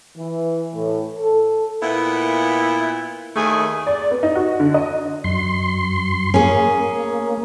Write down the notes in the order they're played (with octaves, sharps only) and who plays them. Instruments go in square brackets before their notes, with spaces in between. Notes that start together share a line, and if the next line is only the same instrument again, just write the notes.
[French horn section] E3
A2
A4
[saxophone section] A#2 B3 E4
D#2 D#3 A3 G#4
[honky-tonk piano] D5
B3
D#4
F#4
D3
D#5
[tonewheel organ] F#2 C6
[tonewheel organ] A#3 [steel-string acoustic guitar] C#4 G#4